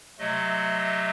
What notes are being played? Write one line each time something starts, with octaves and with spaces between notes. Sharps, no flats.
C3 F#3 A3 D#5